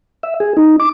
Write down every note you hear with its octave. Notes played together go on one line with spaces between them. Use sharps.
E5
G#4
D#4
D6